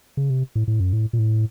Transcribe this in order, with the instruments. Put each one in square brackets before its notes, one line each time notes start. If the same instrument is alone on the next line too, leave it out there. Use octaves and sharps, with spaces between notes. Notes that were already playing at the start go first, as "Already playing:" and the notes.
[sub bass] C#3
C3
A2
A2
F#2
A2
A#2
A2